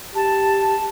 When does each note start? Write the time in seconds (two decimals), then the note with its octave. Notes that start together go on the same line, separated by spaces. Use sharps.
0.15 G4 A5